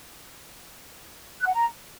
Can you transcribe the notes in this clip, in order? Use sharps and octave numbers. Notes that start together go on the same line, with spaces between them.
F#6
F#5
A#5